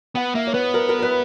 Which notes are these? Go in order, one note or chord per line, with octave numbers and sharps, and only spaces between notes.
B3 F#5
A#3 E5
C#5
B3 B4
A#4
A#4
A#4
B4